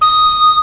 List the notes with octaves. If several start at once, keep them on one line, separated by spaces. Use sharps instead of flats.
D#6